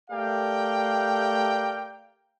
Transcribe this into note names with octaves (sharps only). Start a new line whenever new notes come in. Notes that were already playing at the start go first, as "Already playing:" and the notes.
A3 G4 A#4 D5 F5 G5